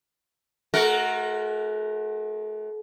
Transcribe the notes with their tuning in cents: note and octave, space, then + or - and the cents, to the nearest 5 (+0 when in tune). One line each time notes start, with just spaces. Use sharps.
A3 -45 F#4 +0 A#4 +0